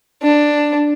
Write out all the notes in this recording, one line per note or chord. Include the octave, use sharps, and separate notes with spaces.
D4